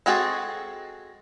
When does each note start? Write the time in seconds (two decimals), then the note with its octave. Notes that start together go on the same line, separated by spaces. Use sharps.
0.06 G#3 C4 F#4 G#4 A4